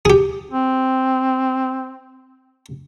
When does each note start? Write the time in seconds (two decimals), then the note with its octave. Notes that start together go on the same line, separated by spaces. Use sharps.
0.05 G4 G#4
0.51 C4